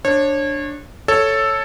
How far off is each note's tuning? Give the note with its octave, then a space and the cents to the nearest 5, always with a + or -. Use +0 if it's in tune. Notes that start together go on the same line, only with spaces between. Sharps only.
D4 +0 C#5 -30
A4 +0 C#5 +0